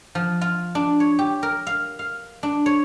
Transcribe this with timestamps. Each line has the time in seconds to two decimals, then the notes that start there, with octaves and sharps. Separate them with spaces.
0.15 F3
0.41 F4
0.75 D4
1.00 C#5
1.19 G4
1.43 A#4
1.67 F5
1.99 F5
2.43 D4
2.66 C#5